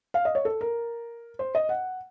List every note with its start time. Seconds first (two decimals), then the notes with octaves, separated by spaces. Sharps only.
0.14 F5
0.25 D#5
0.35 C#5
0.45 A4
0.61 A#4
1.39 C5
1.55 D#5
1.69 F#5